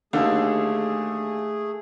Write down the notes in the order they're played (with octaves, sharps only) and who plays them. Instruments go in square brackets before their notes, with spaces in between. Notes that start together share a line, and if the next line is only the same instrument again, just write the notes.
[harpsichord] D#2 [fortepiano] D3 [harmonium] A3 G#4